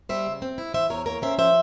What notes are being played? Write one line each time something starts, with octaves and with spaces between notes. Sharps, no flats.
G3 C5 E5
C#3
C4
E4
E3 C5 E5
E2 A#4 C#5
A#3 A#4 C#5
C#4 C5 E5
F3 C5 E5